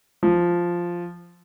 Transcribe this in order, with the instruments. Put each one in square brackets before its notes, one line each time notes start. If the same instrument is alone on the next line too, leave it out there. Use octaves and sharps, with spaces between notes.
[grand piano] F3